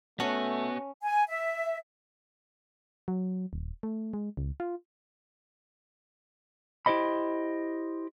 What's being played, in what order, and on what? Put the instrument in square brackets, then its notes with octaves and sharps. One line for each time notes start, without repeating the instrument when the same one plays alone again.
[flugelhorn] A3 [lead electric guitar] B3 F#4 [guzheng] C#4 [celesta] C#5 A5
[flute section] G#5
E5
[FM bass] F#3
D#1
A3
G#3
C#2
F4
[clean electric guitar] E4 G4 C5 D#5 B5